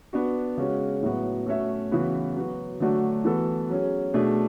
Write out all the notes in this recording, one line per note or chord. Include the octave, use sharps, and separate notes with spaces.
B3 D4 F#4
C#3 G#3 C#4 F#4
A2 F#3 B3 F#4
A3 C#4 F#4 C#5 E5
C#3 E3 B3 F#4 B4
F#3 B3 F#4
D3 F#3 A3 D4 F#4
E3 B3 F#4 A4
F#3 C#4 G#4
B2 A3 D4 G#4